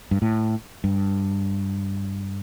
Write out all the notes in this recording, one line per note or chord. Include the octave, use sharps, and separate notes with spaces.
G2
A2
G2